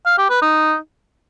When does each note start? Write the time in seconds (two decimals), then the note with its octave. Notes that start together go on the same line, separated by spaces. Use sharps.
0.06 F5
0.18 G4
0.30 B4
0.42 D#4